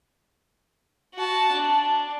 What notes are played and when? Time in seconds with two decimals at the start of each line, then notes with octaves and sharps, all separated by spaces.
1.14 F#4 A5
1.52 D4